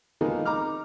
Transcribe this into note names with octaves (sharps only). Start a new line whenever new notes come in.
D#3 F3 G#3 A#3 B3 D#4
D#4 A#5 D6 F6